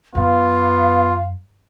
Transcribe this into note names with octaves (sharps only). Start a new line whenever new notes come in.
F#2 B3 F4 F5